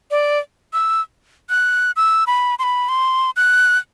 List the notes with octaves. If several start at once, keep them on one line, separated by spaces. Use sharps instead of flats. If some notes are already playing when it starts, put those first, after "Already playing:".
D5
E6
F#6
E6
B5
C6
B5
C6
F#6